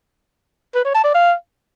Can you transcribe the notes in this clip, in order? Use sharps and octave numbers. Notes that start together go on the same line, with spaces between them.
B4
C#5
A5
D5
F5